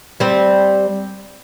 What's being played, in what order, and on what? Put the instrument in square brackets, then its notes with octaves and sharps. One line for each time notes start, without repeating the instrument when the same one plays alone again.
[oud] G3 C4